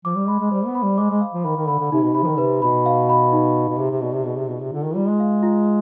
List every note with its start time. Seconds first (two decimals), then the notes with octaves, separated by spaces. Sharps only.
0.05 F3 D6
0.16 G3
0.28 G#3 B5
0.40 G#3
0.51 G3 C5
0.66 B3
0.75 B5
0.83 G3
0.98 G#3 D6
1.10 G#3
1.21 F5
1.33 F3
1.45 D#3 B5
1.57 D#3
1.68 D3 B5
1.80 D3
1.92 C3 D#4
2.04 B2
2.15 C3 B5
2.23 F3
2.27 D#3
2.38 C3 B4
2.62 B2 B5
2.86 F5
3.09 B5
3.32 D#4
3.56 D#4
3.69 B2
3.79 C3 G#4
3.91 C3
4.02 B2 D5
4.14 C3
4.26 B2 G#4
4.37 C3
4.49 B2 F4
4.60 C3
4.72 D3 F4
4.84 D#3
4.95 G3 F4
5.08 G#3
5.20 F5
5.43 F4